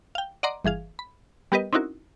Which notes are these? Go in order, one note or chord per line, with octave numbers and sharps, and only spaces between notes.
F5 G5
D5 D#5 F#5 A#5 C6 D6
G1 E3 G#4 F5
B5
G3 B3 G4 A#4 B4 D#5
C4 C#4 D#4 E4 F#4 A#4